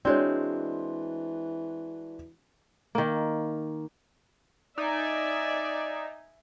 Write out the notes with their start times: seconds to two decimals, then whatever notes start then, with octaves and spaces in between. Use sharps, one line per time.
0.05 E3 G#3 C4 D4 F#4 C#5 D5 C6
2.95 D#3 A#3
4.78 D#4 D5 E5 G#5